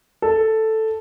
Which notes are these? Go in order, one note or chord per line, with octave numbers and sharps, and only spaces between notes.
A4